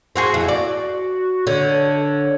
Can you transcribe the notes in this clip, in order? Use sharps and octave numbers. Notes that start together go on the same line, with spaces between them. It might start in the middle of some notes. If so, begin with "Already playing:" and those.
C4 F#4 G#4
F2 E4
F#4 D5
D3 C#5